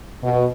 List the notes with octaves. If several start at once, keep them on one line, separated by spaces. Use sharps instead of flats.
B2